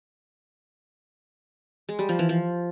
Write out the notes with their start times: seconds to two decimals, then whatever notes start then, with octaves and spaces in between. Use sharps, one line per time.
1.89 G#3
1.99 G3
2.09 F3
2.19 E3
2.29 F3